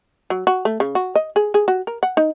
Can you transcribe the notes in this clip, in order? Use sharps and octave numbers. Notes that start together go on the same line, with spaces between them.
F#3
F#4
A3
C#3
F#4
D#5
G#4
G#4
F#4
A#4
F#5
D#4